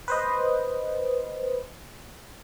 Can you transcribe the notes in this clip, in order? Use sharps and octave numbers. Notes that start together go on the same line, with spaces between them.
B4 C5 D#5